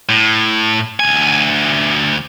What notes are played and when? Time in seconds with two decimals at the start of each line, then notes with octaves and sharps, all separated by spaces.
0.09 A2
1.00 D2 G#5